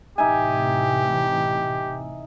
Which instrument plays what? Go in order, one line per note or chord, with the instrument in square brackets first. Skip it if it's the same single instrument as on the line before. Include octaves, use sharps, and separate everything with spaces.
[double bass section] A2 C3 E3 [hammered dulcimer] D#4 E5 G#5 [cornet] G4